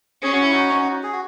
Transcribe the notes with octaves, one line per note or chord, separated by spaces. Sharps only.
C#4 G#4
F#4
E4
D#4 F#4
G#4
F#4